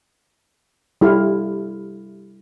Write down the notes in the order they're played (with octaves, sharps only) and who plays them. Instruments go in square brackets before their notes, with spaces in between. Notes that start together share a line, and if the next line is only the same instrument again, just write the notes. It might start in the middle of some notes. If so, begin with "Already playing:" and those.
[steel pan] G3 E4 A4 F5